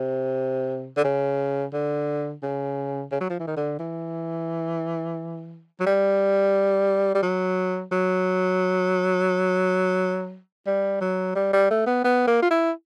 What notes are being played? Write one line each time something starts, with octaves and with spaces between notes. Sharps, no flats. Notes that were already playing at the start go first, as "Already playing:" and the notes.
Already playing: C3
D3
C#3
D3
C#3
C#3
F#3
F3
E3
D#3
D3
E3
F#3
G3
G3
F#3
F#3
G3
F#3
G3
G3
A3
B3
B3
A#3
F4
E4